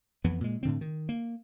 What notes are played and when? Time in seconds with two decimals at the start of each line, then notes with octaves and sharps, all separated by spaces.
0.24 F2 E3 B3
0.41 A#2 G#3
0.63 A2 D3 C4
0.81 D#3
1.09 A#3